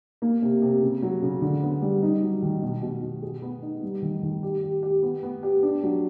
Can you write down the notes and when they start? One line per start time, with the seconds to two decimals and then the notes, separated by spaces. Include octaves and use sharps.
0.22 A#3
0.42 C3
0.62 C3
0.82 C#3
1.02 F#3
1.22 C#3
1.42 D3
1.62 B3
1.82 G3
2.02 D#4
2.22 F#3
2.42 D#3
2.62 B2
2.82 B2
3.02 B2
3.22 G#4
3.42 B3
3.62 D#4
3.82 G3
4.02 D#3
4.23 D#3
4.43 G4
4.63 G4
4.83 G4
5.03 B3
5.23 B3
5.43 G4
5.63 D4
5.83 F#3